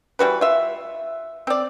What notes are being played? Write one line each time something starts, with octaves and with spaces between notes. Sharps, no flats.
E3 G3 F#4 B4
F4 E5
C4 D5